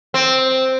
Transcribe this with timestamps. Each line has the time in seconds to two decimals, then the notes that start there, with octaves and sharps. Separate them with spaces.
0.14 C4